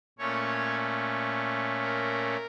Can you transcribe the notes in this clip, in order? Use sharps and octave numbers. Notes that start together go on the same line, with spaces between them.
A#2 A3 C#4 C#5
A#4